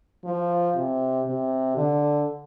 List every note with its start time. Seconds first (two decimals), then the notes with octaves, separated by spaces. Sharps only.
0.24 F3
0.75 C3
1.27 C3
1.76 D3